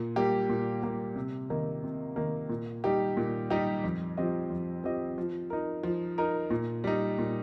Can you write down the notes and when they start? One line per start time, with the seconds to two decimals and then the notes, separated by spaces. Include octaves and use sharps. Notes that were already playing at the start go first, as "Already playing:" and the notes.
Already playing: A#2
0.16 G3 A#3 G4
0.49 A#2
0.82 G3 A#3 G4
1.16 C3
1.50 D#3 A#3
1.83 C3
2.16 D#3 A#3
2.49 A#2
2.84 G3 D#4 G4
3.17 A#2
3.50 G3 D#4 G4
3.84 F2
4.17 F3 C4 G4 D#5
4.50 F2
4.84 F3 C4 G4 D#5
5.18 F3
5.50 D#4 A#4
5.84 F3
6.18 D#4 A#4
6.50 A#2
6.84 G3 D#4
7.18 A#2